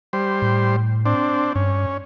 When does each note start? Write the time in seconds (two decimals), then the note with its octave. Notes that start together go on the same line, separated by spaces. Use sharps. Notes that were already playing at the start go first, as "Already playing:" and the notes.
0.13 G3 C5
0.42 A2
1.06 C4 D4
1.55 G2 C#4